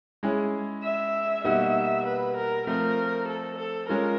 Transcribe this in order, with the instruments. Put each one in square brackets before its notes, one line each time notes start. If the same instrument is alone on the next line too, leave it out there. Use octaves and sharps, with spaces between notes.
[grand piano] G#3 C#4 E4 G#4
[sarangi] E5
[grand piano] B2 G3 A#3 D#4 F#4 [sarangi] E5
[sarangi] B4
A#4
[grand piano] F3 A3 C4 [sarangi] A#4
[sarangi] A4
A4
[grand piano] G#3 C#4 F4 [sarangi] A#4